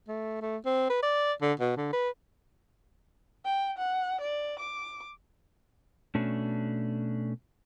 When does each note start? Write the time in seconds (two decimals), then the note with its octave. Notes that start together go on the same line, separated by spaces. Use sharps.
0.08 A3
0.41 A3
0.65 C4
0.89 B4
1.02 D5
1.42 D3
1.60 B2
1.77 D3
1.93 B4
3.45 G5
3.78 F#5
4.21 D5
4.59 D6
6.15 B2 A3 C#4 D4